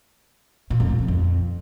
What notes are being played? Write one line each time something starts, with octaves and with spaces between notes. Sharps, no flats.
A#2
F2
A#2
C3
F2